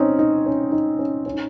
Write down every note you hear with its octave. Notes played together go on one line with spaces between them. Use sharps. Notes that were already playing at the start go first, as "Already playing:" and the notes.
Already playing: C4 C#4 D#4
D#4
C#4
D#4
C#4
C#4
D#4